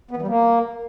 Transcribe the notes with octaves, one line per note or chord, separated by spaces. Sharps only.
B3
E3
G3
A#3